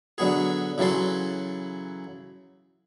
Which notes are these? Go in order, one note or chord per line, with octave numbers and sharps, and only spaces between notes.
D3 F#3 B3 G#4
C#3 E3 F#3 A4 C6